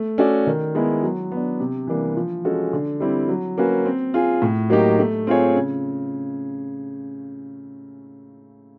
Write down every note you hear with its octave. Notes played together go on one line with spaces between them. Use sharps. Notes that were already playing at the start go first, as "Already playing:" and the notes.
Already playing: A3
C#4 F#4 A4 D5
D#3
G#3 B3 E4
F#3
B3 D4
C3
E3 G3 A#3 D4
F3
G#3 C#4 F#4 A4
D3
G3 C4 E4
F#3
A#3 C#4 F#4 B4
C4
F4 G#4
A2
F#3 A#3 D#4 G4
A3
C4 F4 G#4 C#5
C#3